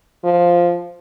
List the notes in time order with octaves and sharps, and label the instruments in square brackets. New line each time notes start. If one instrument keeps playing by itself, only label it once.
[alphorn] F3